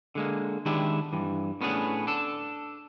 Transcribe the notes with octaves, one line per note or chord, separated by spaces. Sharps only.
D3 G#3 A#3
D#3 G#3 B3 D4 E4 G4
G2 E3
A2 B3 C#4 D4 G#4
D4 A4